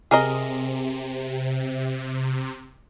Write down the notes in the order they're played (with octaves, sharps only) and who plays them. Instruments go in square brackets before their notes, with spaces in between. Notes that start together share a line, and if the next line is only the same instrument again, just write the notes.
[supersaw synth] C3 [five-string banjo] G#4 A#4 D#5